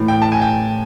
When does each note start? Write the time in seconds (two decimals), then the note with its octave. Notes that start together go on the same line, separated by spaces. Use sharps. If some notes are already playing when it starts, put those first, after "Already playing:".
Already playing: A2 E3
0.08 G5
0.22 A5
0.32 G#5
0.42 G5